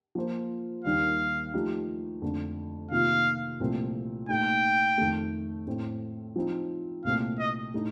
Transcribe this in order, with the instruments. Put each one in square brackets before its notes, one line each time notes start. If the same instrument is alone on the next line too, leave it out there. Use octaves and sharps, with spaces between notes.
[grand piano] F3 A#3 F4 C5
[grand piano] D#2 D#3 G3 [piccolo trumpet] F5
[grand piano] F3 A3 D#4 G4
F2 D3 A3
[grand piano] C3 D#3 A#3 F4 [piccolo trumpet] F5
[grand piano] C2 A#2 F3 A3 C4
[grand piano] A#2 A3 D#4 [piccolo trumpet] G5
[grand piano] F2 D#3 A3
A2 A3 C4
F3 C4 D#4
[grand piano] C2 A#2 A3 C4 [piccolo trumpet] F5
[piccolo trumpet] D#5
[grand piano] A2 A3 D#4